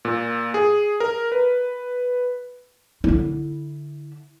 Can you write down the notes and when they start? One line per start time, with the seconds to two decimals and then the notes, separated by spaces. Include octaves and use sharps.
0.05 A#2
0.54 G#4
1.00 A#4
1.32 B4
3.04 D3 E4